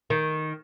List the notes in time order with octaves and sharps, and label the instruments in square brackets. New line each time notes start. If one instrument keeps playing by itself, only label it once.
[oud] D#3